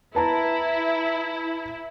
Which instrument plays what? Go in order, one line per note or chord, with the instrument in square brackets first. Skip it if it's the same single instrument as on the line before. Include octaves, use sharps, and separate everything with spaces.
[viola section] E4 [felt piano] B4 A5 A#5